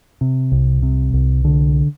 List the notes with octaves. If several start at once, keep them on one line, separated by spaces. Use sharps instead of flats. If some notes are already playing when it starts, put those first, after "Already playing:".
C3
C2
C3
C2
D3